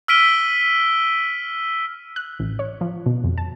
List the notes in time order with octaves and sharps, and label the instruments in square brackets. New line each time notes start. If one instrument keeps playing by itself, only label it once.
[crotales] E6 F6 B6 D7 D#7 G7
[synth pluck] F#6
A1
C#5
F3
B2
F2
A5